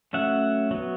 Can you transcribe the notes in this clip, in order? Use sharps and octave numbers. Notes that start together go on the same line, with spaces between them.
F#3 A3 C#4 E5 F#5
F#3 B3